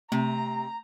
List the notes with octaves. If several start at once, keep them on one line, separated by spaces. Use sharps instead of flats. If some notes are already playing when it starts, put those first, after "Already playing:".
C3 A3 A#5